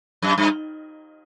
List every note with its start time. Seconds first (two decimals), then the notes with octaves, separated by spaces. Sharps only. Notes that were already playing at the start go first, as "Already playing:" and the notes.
0.22 F#2
0.38 G2